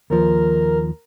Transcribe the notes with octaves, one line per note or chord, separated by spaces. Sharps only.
D#2 F3 A#4